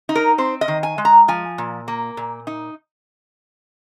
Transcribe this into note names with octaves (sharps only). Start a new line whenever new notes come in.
D#4
A#4
C4 C5
D#5
D#3
G#5
G#3
A#5
F3 G#5
A#2
A#3
A#2
D#4